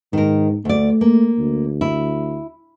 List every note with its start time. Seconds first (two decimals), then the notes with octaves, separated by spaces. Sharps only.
0.13 G#2 D#3 A#4
0.65 D2 A3 D5
1.01 A#3
1.38 D2
1.81 E4